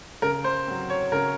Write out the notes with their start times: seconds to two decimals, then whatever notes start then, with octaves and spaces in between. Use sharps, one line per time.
0.22 C#3 A#4
0.44 C5
0.68 F#3 C4
0.90 C#5
1.12 C#3 A#4